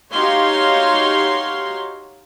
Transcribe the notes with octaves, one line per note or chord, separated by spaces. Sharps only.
D#4 F#4 G4 C#5 F5 C6